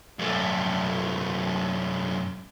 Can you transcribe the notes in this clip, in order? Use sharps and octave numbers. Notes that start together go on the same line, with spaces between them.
F#2 A3